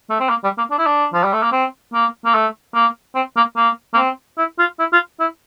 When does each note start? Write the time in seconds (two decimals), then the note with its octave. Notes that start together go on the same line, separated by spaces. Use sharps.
0.10 A3
0.20 C4
0.29 A#3
0.44 G3
0.58 A#3
0.71 D4
0.78 E4
0.86 D4
1.14 F3
1.24 G3
1.33 A3
1.43 A#3
1.52 C4
1.94 A#3
2.25 A#3
2.34 A3
2.74 A#3
3.15 C4
3.36 A#3
3.56 A#3
3.94 A#3
3.97 C4
4.38 E4
4.59 F4
4.79 E4
4.93 F4
5.20 E4